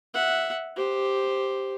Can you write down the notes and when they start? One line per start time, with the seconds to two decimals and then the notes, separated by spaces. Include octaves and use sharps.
0.14 E5 F#5
0.76 G4 C5